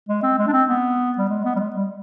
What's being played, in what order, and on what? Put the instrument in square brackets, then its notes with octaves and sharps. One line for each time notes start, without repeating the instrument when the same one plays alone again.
[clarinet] G#3
C4
G#3
D4
C4
B3
G3
G#3
B3
G3
G#3
G3